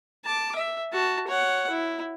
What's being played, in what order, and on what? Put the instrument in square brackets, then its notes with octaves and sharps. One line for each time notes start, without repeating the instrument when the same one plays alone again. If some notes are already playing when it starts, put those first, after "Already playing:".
[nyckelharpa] A5 D6
E5
F#4 A5
C#5 F#5
E4